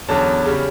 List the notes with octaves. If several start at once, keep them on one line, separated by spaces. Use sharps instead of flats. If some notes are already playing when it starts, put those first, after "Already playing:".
E2 D3 F#3 C#4 A5
C#3 G3 C#4